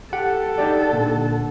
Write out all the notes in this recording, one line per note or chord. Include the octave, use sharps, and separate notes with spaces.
G4 A4 F#5
D#4 G4 D5
A#2 D3